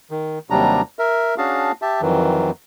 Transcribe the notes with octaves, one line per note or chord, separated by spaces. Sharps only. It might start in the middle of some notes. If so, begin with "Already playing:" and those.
D#3
D#2 C3 F#3 G3 D4 A#5
A#4 E5
C#4 D4 F#4 G#4 F5 A5
G4 E5 A5
F2 D#3 E3 F#3